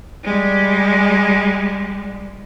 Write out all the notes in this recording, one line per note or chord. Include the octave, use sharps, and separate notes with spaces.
G3 G#3